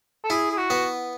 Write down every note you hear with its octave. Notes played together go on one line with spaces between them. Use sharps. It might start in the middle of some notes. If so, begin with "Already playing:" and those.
A4
E4 G#4
G#4
F#4
B3